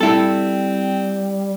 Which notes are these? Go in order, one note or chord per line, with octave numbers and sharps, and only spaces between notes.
G3 C4 E4 A4